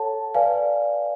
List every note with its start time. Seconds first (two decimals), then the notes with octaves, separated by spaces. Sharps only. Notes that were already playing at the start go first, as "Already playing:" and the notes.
Already playing: A4 C#5 F#5 A5
0.35 B4 D5 F5 G#5